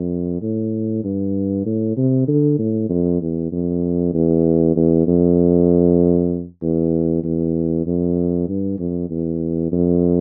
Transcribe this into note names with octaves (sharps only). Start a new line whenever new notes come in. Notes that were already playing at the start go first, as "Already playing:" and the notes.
Already playing: F2
A2
G2
A2
C3
D3
A2
F2
E2
F2
E2
E2
F2
E2
E2
F2
G2
F2
E2
F2